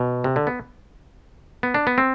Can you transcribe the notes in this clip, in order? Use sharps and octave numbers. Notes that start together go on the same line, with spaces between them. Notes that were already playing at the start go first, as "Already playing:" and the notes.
Already playing: B2
C3
D3
B3
B3
D4
B3
C4